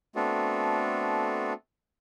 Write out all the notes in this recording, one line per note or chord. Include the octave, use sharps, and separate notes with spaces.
A3 B3 C4 D4 F#4 A4